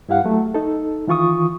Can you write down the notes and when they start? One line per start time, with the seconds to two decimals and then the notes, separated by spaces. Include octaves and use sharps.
0.08 G2 E4 G4 F5 F#5
0.24 F#3 A3
0.54 D#4 A4
1.07 D#3 E3 F4 C#6 D#6